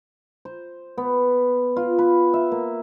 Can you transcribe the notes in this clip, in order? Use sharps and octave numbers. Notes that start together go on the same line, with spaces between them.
C5
B3
F4
B4
E5
A#3